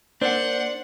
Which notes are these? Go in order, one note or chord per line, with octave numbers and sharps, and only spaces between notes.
A#3 D4 C5 F#5